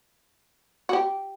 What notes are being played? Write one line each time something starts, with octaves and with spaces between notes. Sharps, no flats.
F#4
G4